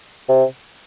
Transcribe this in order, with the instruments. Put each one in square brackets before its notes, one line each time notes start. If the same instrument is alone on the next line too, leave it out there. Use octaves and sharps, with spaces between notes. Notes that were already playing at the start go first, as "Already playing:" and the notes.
[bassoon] C3